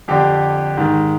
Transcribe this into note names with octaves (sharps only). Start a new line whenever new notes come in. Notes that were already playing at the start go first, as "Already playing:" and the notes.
F2 D3 G4
G#2 D#3